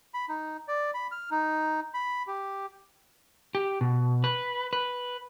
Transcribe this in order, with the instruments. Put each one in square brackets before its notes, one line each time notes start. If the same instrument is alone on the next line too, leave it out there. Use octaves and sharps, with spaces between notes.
[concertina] B5
D#4
D5
B5
F6
D#4
B5
G4
[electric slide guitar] G4
B2
B4
B4